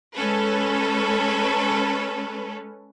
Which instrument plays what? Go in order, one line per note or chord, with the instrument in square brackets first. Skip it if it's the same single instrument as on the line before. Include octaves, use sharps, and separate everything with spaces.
[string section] G#3 C#4 A4 B4